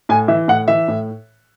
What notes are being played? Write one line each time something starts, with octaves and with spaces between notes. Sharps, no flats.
A2 G#5
E3 E5
A2 F#5
E3 E5
A2